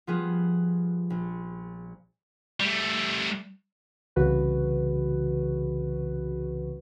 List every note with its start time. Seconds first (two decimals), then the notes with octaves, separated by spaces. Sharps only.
0.07 F3 G3 B3 F4 G#4 B4
1.10 A#1
2.60 G3 A3
4.16 C2 C#3 E3 F#4 B4